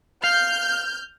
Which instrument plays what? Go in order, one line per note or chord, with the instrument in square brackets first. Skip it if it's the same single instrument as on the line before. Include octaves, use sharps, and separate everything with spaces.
[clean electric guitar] F5 [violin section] F6 G6